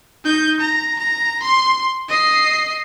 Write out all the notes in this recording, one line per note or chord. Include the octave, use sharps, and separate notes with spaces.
D#4 G6
A#5
A#5
C6
D#5 C7